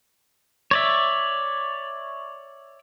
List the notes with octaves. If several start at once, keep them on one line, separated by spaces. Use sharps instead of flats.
C#5 D5 E5